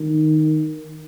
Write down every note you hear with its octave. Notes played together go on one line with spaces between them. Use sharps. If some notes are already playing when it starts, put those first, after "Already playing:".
Already playing: D#3